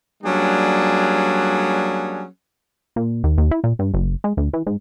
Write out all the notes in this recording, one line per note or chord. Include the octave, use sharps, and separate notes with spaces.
F#3 G3 A#3 C#4 D4 G#4
A#2
D#2
D#2
E4
A#2
G2
F#1
G#3
D2
E3
G#2